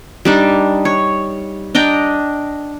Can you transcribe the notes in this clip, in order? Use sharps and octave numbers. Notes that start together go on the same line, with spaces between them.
G3 D4 D#4
C#5
D4 D#5 G5 A#5